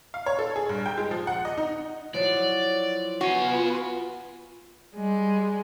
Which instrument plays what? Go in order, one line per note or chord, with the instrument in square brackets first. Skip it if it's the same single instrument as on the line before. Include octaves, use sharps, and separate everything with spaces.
[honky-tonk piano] F5
C#5
A4
G#4
G2
G5
G#3
F3
F#5
D#5
D#4
[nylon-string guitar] F3 F#3 E4 [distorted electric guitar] D5
[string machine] B3 F4 B4 [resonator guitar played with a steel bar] F#4 [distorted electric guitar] F5 G#5
[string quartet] G3 G#3